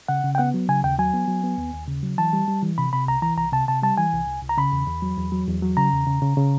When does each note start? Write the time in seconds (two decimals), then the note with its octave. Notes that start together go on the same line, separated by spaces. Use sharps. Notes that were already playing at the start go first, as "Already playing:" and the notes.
0.08 C#3 F#5
0.24 C#3
0.35 G5
0.38 B3 F#5
0.54 F#3
0.69 C#3 G#5
0.83 D#2 G5
0.99 F#3 G#5
1.14 B3
1.28 F#3
1.44 B3
1.58 D#2
1.74 D#2
1.88 C#3
2.03 F#3
2.18 E3 A5
2.33 G3
2.48 G3
2.63 E3
2.78 C3 B5
2.93 C3 B5
3.08 C2 A#5
3.22 E3 A#5
3.37 C2 A#5
3.52 C3 A5
3.68 C3 A5
3.83 G3 A5
3.98 E3 G#5
4.13 C2
4.27 C2
4.42 C2
4.49 A#5
4.58 C#3 B5
4.72 E2
4.87 E2
5.02 F#3
5.17 E2
5.32 F#3
5.48 E2
5.62 F#3
5.77 C#3 A#5
5.93 E2
6.07 C#3
6.22 C#3
6.37 C#3